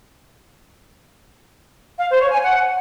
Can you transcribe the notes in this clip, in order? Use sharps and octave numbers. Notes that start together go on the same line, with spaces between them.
F5
C5
C#5
G#5
F#5